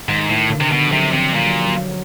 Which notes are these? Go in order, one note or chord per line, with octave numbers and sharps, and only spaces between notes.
G#2 D#3
A2
D3
C3
B2 D3
F3
C3 F#3
C3 F3
A#2 G3
F#3
F3
F#3